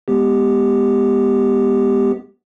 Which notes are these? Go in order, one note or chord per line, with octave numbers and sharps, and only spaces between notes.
G#3 B3 G4